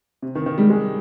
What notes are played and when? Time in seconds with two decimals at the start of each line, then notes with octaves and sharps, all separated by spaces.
0.22 C3
0.35 D#3
0.46 D#3
0.58 G3 G#3
0.70 G#3